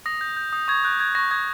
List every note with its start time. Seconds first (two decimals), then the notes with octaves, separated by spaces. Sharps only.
0.06 D#6 A#6
0.21 G6
0.37 G6
0.53 D#6
0.68 C#6 G#6
0.84 F#6 G6
1.00 F#6 G#6
1.15 C#6 A#6
1.31 D#6 G#6